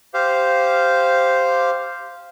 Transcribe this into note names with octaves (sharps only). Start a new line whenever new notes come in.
G4 C5 F5